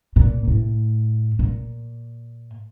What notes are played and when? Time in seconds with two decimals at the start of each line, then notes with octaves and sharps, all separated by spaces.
0.16 A#2
0.48 A2
1.39 A#2